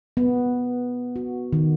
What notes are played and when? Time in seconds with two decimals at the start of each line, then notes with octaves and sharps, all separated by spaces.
0.17 B3
1.16 F#4
1.53 D#3